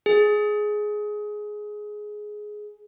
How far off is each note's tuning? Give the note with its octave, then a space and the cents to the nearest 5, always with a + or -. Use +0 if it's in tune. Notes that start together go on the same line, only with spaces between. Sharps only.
G#4 +10